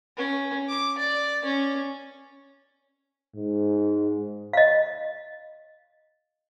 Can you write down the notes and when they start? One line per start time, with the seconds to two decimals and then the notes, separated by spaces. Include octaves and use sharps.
0.17 C#4
0.68 D6
0.98 D5
1.45 C#4
3.36 G#2
4.53 D#5 F5